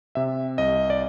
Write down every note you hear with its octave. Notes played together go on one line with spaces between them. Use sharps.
C3 E5
C2 D#5
D5